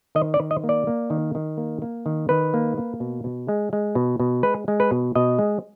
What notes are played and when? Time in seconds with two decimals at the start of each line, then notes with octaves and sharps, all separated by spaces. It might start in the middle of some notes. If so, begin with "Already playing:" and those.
0.15 D#3 D#5
0.34 D5
0.40 D#3
0.51 D#5
0.64 A#3
0.69 D5
0.87 A#3
1.10 D#3
1.35 D#3
1.58 A#3
1.82 A#3
2.06 D#3
2.29 D#3 B4
2.54 A#3
2.77 A#3
3.00 B2
3.24 B2
3.48 G#3
3.73 G#3
3.95 B2
4.20 B2
4.43 G#3 B4
4.68 G#3
4.80 B4
4.91 B2
5.15 B2 D#5
5.39 G#3